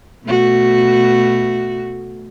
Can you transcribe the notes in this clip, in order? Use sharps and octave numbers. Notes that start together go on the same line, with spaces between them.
B2 A3 F#4